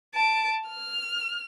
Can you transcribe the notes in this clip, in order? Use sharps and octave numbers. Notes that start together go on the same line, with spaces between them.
A5 D7
F6